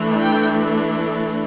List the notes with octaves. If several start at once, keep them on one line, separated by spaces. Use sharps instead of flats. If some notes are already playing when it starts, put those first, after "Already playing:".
Already playing: E3 A3 D4
G5